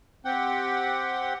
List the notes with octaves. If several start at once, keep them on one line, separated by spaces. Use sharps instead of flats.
C4 G4 F#5 G5